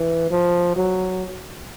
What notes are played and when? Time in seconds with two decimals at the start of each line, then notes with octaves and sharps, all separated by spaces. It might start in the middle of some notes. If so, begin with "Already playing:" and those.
Already playing: E3
0.31 F3
0.76 F#3